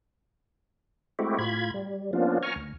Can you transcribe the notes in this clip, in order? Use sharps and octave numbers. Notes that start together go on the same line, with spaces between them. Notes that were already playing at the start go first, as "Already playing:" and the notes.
G#3 A3 C4 E4 F#4 G4
A2 F4 B5 G#6
G3
F3 A#3 B3 C#4 D4 F4
G#5 A#5 C#6 F6
D2